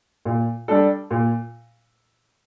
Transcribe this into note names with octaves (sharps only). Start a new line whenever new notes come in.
A#2
G3 D4 A4
A#2